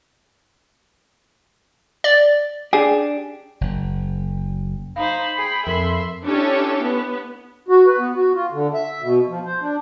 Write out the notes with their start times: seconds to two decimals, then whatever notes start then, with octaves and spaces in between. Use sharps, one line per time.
2.04 D5
2.73 D4 G4 G#4
3.61 F#1
4.96 D#4 C5 F5 B5
5.37 G#4 G5 C7
5.67 F2 A#4 E5 C6
6.25 C#4 D4 E4 G4 A4 C#5
6.83 B3
7.69 F#4
7.86 B4
7.99 B3
8.15 F#4
8.34 F4
8.52 D3
8.74 E5
9.02 B2
9.29 F3
9.45 C5
9.61 D4